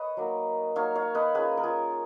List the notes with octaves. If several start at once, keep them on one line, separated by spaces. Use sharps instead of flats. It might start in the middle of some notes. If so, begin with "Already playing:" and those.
Already playing: B4 C#5 D#5
F#3 A#3 D#4
F#3 A#3 D#4 C#5 F5
C#5 F5
B4 D#5
A#3 C#4 F4 G#4 B4
A#4
F4 G#4